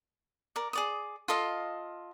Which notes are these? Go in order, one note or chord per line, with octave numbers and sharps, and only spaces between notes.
A#4 D5
G#4 D5 D#6
F4 A4 D#5 F5